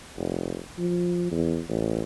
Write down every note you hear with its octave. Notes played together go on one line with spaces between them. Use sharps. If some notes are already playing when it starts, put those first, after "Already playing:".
F1
F3
E2
A1